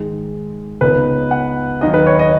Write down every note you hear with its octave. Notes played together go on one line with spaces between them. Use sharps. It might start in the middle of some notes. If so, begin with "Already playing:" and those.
Already playing: G#2 D#3 G#3
C#2 C#3 B3 D#4 B4
F#5
D#2 D#3 F#3 D#5
B4
C#5
D#5